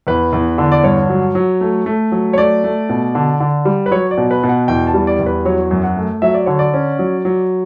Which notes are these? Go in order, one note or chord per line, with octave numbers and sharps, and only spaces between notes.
E2 B4
E2
D3
D5
G2 C#5
F#3
F#3
A3
A3
F#3
C#5
A3 D5
A3
B2
D3
D3
G3
B4
F#3 C#5
D5
B2
B4
B2
F#5
E2 G5
A5
G3
D5
E2
B4
F#3 C#5
F#2
F#5
A3
F#3 E5
D5
D3 C#5
D5
C#4
F#3
F#3